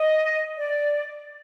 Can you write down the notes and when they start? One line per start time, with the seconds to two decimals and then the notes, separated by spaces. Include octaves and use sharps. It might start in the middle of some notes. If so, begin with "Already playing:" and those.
Already playing: D#5
0.58 D5